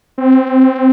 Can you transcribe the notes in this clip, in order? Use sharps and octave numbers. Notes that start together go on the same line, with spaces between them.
C4